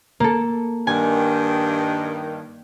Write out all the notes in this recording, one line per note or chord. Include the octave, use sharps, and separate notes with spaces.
A#3 A4
G2 D#3 G#5